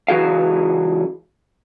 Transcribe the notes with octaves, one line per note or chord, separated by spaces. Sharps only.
C#2 E3 F#4 G#4 F5